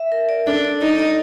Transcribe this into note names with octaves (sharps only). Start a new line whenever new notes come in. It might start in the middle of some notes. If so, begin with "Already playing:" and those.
Already playing: E5
A#4
D5
D4 A4
D5
D#4 A4
D5